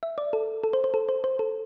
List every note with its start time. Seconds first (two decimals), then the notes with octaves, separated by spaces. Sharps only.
0.03 E5
0.18 D5
0.33 A4
0.64 A4
0.73 C5
0.84 C5
0.94 A4
1.09 C5
1.24 C5
1.39 A4